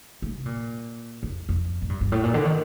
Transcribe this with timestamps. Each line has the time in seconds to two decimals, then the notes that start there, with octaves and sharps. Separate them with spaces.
0.22 A3
0.34 C3
0.46 A#2
1.23 F2
1.49 F2
1.82 A2
1.89 G2
2.01 G2
2.12 A2
2.24 A#2
2.34 D3
2.45 D#3